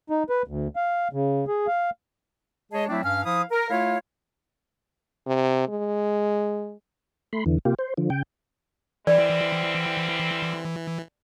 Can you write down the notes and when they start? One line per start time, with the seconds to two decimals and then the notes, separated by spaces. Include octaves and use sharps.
0.10 D#4
0.30 B4
0.48 D2
0.76 F5
1.13 C#3
1.48 G#4
1.67 F5
2.72 G#3 G#4 C#5 D#5 A5
2.89 F#3 A3 C4 D4 E4
3.04 G2 C#4 F5 F6
3.25 F3 E4 F5 D#6
3.51 A#4
3.70 A3 E4 F4 C#5 F5
5.27 C3
5.68 G#3
7.33 A3 B5 C6
7.46 E2 D3 E3
7.65 C3 A#3 F4 G4
7.79 C5
7.97 D3 F3
8.10 C#3 G5
9.07 D3 E3 G3 C4 D5